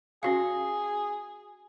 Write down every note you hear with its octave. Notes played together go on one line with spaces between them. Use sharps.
C#4 F#4 G#4 F5